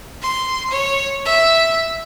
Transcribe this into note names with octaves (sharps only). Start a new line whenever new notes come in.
C6
C#5
E5